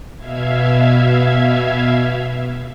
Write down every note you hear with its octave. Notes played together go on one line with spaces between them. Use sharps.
B2 E5 F5 G#6